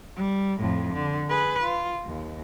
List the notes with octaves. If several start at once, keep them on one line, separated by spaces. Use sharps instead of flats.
G3
F2 A2
D3
G#4 B4
F4
D#2